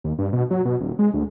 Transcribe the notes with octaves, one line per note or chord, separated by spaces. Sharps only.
D#2
G2
B2
F#3
B2
D#1
G#3
D2